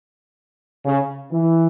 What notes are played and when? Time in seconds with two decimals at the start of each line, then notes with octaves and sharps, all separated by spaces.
0.84 C#3
1.32 E3